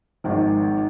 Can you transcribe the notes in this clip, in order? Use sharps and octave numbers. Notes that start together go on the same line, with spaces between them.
G#1 D#3 F3